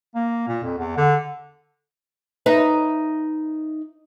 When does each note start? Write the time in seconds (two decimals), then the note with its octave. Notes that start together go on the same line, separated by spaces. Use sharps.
0.15 A#3
0.48 A#2
0.63 F2
0.78 E2
0.97 D3
2.46 D#4 B4 E5